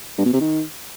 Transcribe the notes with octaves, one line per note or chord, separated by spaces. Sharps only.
G2
B2
C3
D#3